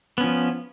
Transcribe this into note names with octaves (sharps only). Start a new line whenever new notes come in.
F3 B3 C#4